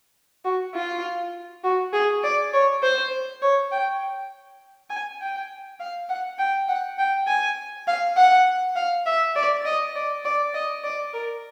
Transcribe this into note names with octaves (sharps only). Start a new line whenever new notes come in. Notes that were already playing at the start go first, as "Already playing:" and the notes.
F#4
F4
F#4
G#4
D5
C#5
C5
C#5
G5
G#5
G5
F5
F#5
G5
F#5
G5
G#5
F5
F#5
F5
E5
D5
D#5
D5
D5
D#5
D5
A#4